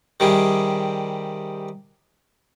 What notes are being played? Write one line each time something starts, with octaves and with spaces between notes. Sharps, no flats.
C3 D#3 G3 G#4